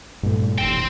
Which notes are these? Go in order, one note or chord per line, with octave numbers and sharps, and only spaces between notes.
G2 A#2 A3
F1 A#1 D#2 C5 G5